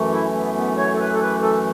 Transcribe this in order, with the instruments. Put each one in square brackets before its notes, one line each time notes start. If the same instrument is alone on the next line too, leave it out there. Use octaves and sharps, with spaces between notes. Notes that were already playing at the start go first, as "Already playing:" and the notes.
Already playing: [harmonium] F#2 E3 A3
E4
B3
B3
C#5
A4
B4
A4
B4
A4